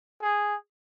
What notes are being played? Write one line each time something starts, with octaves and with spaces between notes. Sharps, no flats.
G#4